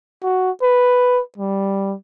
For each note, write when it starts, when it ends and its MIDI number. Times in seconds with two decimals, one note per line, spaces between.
0.23 0.51 66
0.62 1.21 71
1.38 1.95 55